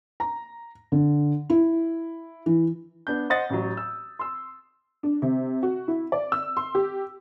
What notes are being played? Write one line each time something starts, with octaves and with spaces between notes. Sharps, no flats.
A#5
D3
E4
E3
B3 D4 G6
C5 D#5 F#5 D#6 A6
A1 F#3
E6
C6 E6
D4
C3
F#4
E4
D5
E6
C6
G4